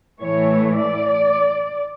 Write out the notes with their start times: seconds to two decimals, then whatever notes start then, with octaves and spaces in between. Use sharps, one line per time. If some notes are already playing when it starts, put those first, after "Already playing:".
0.21 A2 E3 A3 C#5
0.76 D5